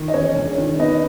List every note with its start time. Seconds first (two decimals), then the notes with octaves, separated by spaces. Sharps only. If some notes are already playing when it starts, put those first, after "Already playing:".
Already playing: D#3
0.08 D#5
0.14 E2 C#4 C#5
0.35 E1
0.58 D#3
0.79 B3 D#4 D#5